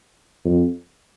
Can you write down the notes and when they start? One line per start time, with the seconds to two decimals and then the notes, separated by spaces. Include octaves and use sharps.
0.45 F2